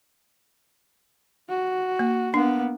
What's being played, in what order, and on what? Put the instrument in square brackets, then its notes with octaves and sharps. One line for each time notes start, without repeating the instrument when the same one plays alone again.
[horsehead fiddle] F#4
[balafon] A#3
[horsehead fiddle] A#3 B3 [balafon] D4